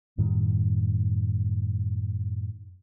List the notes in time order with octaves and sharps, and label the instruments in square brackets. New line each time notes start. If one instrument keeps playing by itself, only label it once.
[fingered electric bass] F#2 A2 D#3 G3